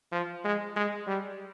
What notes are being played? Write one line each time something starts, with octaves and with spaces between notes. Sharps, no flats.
F3
G#3
G#3
G3